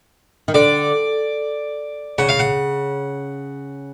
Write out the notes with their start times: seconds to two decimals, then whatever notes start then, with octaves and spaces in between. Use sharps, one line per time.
0.48 D#3
0.54 D3 D5
2.18 C#3 F#5
2.29 F5
2.39 F#5